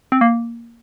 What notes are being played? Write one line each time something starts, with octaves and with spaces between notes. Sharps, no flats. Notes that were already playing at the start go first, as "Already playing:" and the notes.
C4
A#3